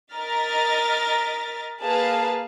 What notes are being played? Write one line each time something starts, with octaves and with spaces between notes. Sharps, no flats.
A#4 D#5 F6 A6 B6
A#3 G#4 B4 F5 A5